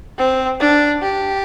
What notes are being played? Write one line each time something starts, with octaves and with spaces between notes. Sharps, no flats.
C4
D4
G4